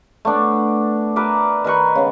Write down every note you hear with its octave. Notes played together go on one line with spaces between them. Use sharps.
A3 B3 D4
A#4 B4 D5 E5
D#3 A#4 B4 C#6
C#3 B3